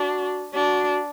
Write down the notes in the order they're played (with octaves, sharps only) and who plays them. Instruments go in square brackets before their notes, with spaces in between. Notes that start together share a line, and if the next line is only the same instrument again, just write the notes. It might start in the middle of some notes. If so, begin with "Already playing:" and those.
Already playing: [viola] D4 [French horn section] F#4
[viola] D4 [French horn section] F#4